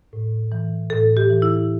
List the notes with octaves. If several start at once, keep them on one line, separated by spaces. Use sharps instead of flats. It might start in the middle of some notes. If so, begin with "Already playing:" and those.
A2
E3
A2 A4
G4
E3
E4